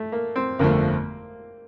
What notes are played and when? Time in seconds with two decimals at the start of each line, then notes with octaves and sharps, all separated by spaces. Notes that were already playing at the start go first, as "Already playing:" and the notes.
Already playing: A3
0.12 A#3
0.36 C4
0.59 G1 F2 D3 F3 A3 A#3